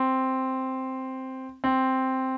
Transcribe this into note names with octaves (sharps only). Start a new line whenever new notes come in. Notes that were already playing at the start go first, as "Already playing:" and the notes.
Already playing: C4
C4